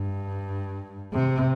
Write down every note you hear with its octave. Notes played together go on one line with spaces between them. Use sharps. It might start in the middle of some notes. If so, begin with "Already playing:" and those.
Already playing: G2
C3